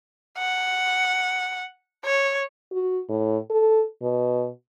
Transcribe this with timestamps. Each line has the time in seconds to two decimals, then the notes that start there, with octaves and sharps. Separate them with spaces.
0.38 F#5
2.05 C#5
2.72 F#4
3.09 A2
3.50 A4
4.02 B2